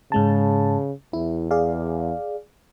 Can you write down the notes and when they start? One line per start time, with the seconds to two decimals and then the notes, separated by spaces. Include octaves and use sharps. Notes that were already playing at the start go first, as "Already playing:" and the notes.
0.12 G#2 C#3 G#3 A5
1.13 E2 E4
1.51 G#4 D5 F5